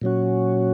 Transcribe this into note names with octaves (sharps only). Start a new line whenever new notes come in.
A#2 F#3 C#4 F#4